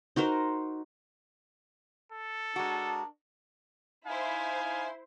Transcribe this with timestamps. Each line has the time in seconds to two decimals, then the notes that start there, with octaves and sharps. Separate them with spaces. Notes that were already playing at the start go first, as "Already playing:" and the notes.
0.16 D#4 F#4 A#4 C5
2.12 A4
2.56 G#3 D4 F#4 A#4
4.07 D#4 E4 C5 F5 G#5